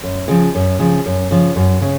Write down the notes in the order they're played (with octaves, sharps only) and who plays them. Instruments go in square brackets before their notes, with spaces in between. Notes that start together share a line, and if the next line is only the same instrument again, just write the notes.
[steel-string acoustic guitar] F#2
C#3 F3
F#2
C#3 F3
F#2
C#3 F3
F#2
C#3